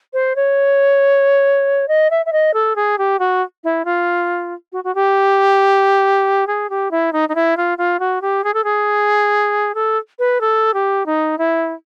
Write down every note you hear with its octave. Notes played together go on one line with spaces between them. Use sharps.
C5
C#5
D#5
E5
E5
D#5
A4
G#4
G4
F#4
E4
F4
F#4
F#4
G4
G#4
G4
E4
D#4
D#4
E4
F4
F4
F#4
G4
G#4
A4
G#4
A4
B4
A4
G4
D#4
E4